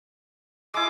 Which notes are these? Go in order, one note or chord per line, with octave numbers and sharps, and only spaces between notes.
G#3 E4 D6